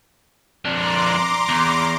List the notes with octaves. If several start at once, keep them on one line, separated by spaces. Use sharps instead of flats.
F2 D4 A#5 C6 D6
E2